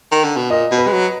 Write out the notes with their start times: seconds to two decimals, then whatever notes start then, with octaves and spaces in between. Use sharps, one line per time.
0.12 D#3
0.24 D3
0.37 B2
0.50 A#2 D#5
0.71 B2
0.78 B4
0.87 G#3
0.92 F#3